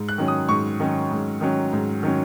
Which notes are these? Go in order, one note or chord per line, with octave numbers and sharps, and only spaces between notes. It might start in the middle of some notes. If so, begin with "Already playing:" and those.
Already playing: G#2
F#6
D#3 F#3 C#4
D#6
G#2 C#6
D#3 F#3 C#4
G#2
D#3 F#3 C#4
G#2
D#3 F#3 C#4